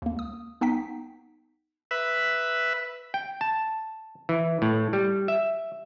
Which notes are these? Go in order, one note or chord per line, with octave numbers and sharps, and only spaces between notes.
D#2 A#3
C#2 D#6
C2 B3 D#4 G5 B6
B4 E5
G5
A5
E3
A2
G3
E5